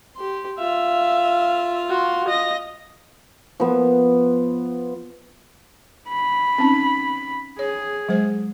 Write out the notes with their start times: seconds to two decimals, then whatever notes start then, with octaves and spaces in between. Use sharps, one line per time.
0.15 G4 C6
0.59 F4 E5 F5
1.89 F#4 C6
2.28 D#5 A#6
3.60 F3 B3
6.09 B5
6.58 C4 C#4 D#4
7.59 G#4 C#5
8.09 F#3 G#3 C5